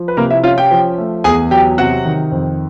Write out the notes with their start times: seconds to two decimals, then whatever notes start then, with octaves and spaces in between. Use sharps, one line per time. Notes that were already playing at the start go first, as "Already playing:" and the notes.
Already playing: F3
0.08 B4
0.17 C3 A#3 A#4
0.30 E4 E5
0.44 C#4 F4 F5
0.58 G4 G5
0.71 F3
0.98 A3
1.24 E2 G#4 G#5
1.51 F#3 G4 G5
1.78 C3 F#4 F#5
2.05 D#3
2.32 F2